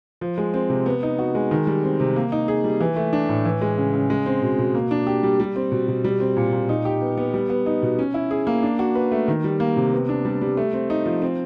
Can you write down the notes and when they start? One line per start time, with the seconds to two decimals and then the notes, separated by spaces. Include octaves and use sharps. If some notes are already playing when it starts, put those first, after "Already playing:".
0.21 F3
0.38 G#3
0.54 C4
0.69 C3
0.86 B3
1.03 D#4
1.19 F#4
1.35 G#3
1.51 D#3
1.67 G3
1.83 C4
2.00 C3
2.16 A#3
2.32 D#4
2.48 G#4
2.64 G3
2.80 E3
2.96 A3
3.13 D4
3.29 A2
3.45 E3
3.62 G#3
3.78 C#3
3.94 C#3
4.10 G#3
4.26 C4
4.42 B2
4.58 B2
4.75 A#3
4.91 D4
5.07 G4
5.23 G3
5.40 G3
5.56 C4
5.72 B2
5.88 B2
6.04 G3
6.20 C4
6.36 A#2
6.53 A#2
6.69 D#4
6.85 G4
7.01 B3
7.17 B3
7.34 G3
7.50 B3
7.66 D#4
7.82 B2
7.99 C#4
8.14 E4
8.31 G#4
8.47 A#3
8.63 D4
8.79 F#4
8.95 B4
9.12 A3
9.28 D#3
9.44 G3
9.60 A#3
9.76 C3
9.92 B3
10.09 D4
10.25 G3
10.42 G3
10.57 A3
10.73 C4
10.90 D#4
11.06 F3
11.22 C4